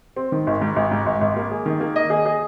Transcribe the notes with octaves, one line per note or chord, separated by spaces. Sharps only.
C4
D#3
G#1
G#2
G#1
G#2
G#1
G#1
A#3
G#4
D#3
A#3
D#5
G#4
G#4